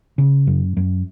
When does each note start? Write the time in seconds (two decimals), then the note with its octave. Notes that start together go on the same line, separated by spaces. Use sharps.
0.18 C#3
0.47 F#2
0.77 F#2